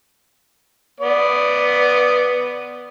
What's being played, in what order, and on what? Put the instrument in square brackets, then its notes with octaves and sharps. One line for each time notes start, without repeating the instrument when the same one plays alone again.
[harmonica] B3 D5